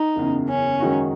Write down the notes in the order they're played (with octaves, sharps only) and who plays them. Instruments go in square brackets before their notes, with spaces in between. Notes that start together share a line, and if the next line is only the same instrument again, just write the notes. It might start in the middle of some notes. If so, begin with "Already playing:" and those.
Already playing: [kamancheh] D#4
[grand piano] F#1 E2 C#3
[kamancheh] C#4
[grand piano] F#2 D#3 G#3 D#4 F#4